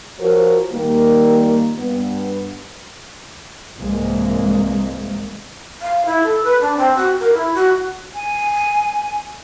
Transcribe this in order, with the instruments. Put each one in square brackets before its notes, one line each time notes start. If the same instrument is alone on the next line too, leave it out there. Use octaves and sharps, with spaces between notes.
[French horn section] F3 F#4 G4 A#4 C5 C#5
A#2 D#3 G3 A#3
G2 B3
[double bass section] C2 G#2 E3 G#3 A#3 C4
[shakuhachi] F5
E4
A4
B4
D4
C4
F#4
A#4
E4
F#4
[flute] G#5